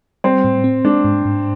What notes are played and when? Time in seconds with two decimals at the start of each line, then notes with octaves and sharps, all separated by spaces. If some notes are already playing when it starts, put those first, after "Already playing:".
0.24 G3 C4
0.44 A2
0.64 C4
0.85 G#3 D4
1.04 G#2
1.25 G#2